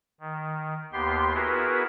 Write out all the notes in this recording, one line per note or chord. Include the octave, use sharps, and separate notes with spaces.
D#3
D#2 B3 G4 C6
B3 E4 F#4 G#4 A#4 B4